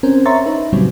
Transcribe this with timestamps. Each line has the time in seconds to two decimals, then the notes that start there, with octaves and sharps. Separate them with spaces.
0.03 C4 C#4 A#4 C5
0.26 C#5 E5 A#5 C6 C#6 A6
0.45 D#4 B4 E5
0.73 A#2 C#3 F#3 G3 C4 C#4